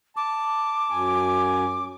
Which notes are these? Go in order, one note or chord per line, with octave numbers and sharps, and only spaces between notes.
A5 D6
F#2 G#5